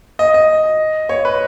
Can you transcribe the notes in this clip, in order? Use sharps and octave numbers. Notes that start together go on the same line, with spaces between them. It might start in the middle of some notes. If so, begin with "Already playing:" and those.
D#5
D#5
C#5
B4